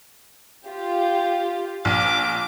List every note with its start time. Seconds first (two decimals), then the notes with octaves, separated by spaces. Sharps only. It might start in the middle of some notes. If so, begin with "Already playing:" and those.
0.65 F4 G4
1.85 A#1 D6